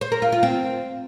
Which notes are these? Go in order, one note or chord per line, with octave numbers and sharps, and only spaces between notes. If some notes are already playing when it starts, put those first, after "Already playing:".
C5
A#4
F4
F4
C4